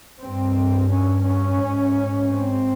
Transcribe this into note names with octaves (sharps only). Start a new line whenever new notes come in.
G2 C4
C#4
C#4
G#2
C4